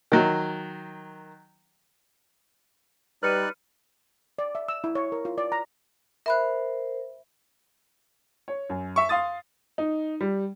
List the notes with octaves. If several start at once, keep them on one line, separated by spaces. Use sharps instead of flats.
D#3 F#3
G3 D#4 B4 D5 F6 F#6 C#7 D#7
D5
E5
E6
E4
C#5
A#4
F4
D5
A#5
A#4 C5 E5 B5 F#6
C#5
F#2
E5 C#6
F5 C6 D#6 A6
D#4
G3